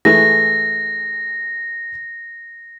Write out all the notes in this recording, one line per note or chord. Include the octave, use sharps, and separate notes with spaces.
E3 G#3 A3 A#6